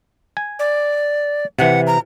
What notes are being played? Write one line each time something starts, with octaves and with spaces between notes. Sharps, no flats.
G#5
D5
C3 E3 F#5
A#5